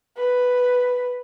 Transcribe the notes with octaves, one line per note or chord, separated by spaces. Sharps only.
B4